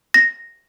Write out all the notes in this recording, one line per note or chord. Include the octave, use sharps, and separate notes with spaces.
A#6